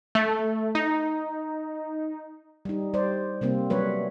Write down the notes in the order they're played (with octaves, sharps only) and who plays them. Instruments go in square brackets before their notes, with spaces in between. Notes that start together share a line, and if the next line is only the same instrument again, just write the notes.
[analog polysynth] A3
D#4
[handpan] G3 D#4
G3 C5 D5
C3 G3 A#3 C4
F#3 G3 A3 C#4 B4 C#5